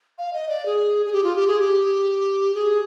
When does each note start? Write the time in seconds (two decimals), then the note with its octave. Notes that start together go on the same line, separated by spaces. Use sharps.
0.18 F5
0.33 D#5
0.49 D5
0.66 G#4
1.06 G#4
1.13 G4
1.24 F4
1.36 G4
1.47 G#4
1.59 G4
2.54 G#4